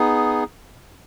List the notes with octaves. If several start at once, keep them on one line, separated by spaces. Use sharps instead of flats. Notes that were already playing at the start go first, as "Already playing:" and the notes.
Already playing: B3 D#4 G#4